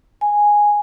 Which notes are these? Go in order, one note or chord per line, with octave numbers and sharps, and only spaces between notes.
G#5